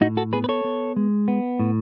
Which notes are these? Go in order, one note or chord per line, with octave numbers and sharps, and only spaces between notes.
A2 D#4 F#4
F#4 A4
B3 G#4 B4
B4
A4 C#5
B3
G#3
B3
A2